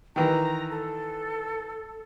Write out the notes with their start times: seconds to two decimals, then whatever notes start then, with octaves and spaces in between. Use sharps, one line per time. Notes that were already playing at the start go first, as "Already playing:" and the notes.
0.16 D#3 E3 A#5
0.70 A4